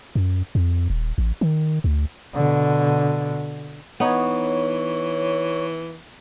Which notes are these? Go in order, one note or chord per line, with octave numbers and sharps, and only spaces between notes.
F#2
F2
D#1
A1
D#3
D2
B2 D3
E3 B3 D#4 C#5